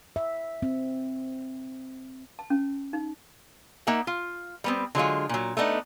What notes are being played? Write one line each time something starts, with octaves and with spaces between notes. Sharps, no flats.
E5
C4
A5
C#4
D#4
A#3 D#4 E5 F#5
F4
G3 B3 C4
D3 F#3 G#3 F4
A#2 F#3
A3 B3 D4 D#4